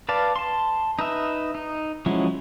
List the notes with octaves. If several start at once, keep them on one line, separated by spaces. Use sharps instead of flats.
B4 D5 F5 A5
A5 C6
D#4 B4 E5
D#4
F3 F#3 G#3 C#4 E4